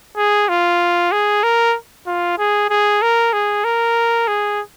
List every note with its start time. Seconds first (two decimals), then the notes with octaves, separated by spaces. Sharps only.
0.17 G#4
0.49 F4
1.12 G#4
1.43 A#4
2.07 F4
2.38 G#4
2.70 G#4
3.02 A#4
3.33 G#4
3.64 A#4
4.28 G#4